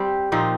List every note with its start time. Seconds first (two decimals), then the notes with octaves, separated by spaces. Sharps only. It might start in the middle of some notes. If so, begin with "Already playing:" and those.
Already playing: G3 C4 G4
0.32 A#2 F3 C4 D#4